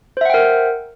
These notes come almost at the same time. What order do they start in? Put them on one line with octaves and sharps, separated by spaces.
C5 E5 F#5 G5 A#4